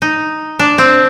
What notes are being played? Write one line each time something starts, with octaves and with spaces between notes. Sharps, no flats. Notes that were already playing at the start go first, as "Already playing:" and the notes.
D#4
D4
C4